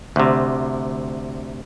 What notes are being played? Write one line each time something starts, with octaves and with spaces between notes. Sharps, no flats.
D2 C3